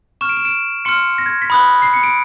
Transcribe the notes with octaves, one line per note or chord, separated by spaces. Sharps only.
C#6 F6 E7
D7
E7
D7
C6 F6 C#7
A#6
G#6
B6
B5 D#6 F#6
C7
C#7
D7